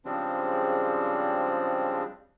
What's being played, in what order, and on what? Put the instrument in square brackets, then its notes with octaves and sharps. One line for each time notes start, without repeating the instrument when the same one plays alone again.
[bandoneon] C#3 F3 G3 G#3 C4 D4